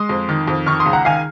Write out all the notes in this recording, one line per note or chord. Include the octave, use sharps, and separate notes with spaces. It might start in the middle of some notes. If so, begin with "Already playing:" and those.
Already playing: G#3 C6 D#6
F2
D#3
F2
D#3 C#6 F6
C6 D#6
C#2
F#5 A#5
D#3 F5 G#5